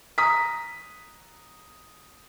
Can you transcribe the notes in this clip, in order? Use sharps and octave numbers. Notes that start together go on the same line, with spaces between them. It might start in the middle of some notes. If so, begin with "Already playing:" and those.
A#5 D#6 B6